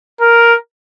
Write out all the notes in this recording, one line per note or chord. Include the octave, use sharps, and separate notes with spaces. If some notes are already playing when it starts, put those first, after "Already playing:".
A#4